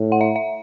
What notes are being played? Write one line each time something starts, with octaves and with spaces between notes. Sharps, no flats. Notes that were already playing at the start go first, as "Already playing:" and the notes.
Already playing: A2
F#5
E5
E5